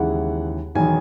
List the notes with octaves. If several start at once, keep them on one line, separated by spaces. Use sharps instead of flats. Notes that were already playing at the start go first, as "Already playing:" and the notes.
Already playing: D#2 C#3 E3 G#3 F#5
E1 E2 D#3 F#3 G#5